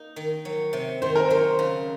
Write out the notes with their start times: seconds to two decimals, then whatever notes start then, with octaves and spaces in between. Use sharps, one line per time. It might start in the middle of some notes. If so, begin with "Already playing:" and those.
Already playing: A#3 D#4
0.16 D#3
0.45 F#3
0.73 C3
1.02 D#3 C5
1.15 A#4
1.28 F#3 C5
1.59 C#3